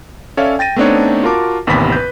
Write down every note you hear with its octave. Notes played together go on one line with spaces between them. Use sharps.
C#4 A4 C#5 D5 E5 F5
G5 A6 A#6 D#7
A3 B3 C4 D4 D#4 C#5
F4 F#4 A#4 A5 D6
A1 D#2 C3 B3 B5 B6
B4 G6